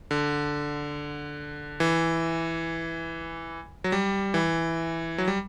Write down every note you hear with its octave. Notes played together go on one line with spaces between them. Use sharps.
D3
E3
F#3
G3
E3
F#3
G3